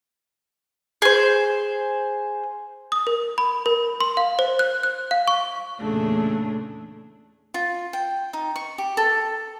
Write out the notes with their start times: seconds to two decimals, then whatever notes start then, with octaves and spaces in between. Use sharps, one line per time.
1.02 G#4 C5
2.92 D#6
3.07 A#4
3.38 B5
3.66 A#4
4.00 C6
4.17 F5
4.39 C5
4.59 F#6
4.83 F#6
5.11 F5
5.28 C#6
5.79 E2 A#2 C#3 A3 D4 G#4
7.54 F4
7.93 G5
8.33 D#4
8.56 C#6
8.78 G4
8.97 A4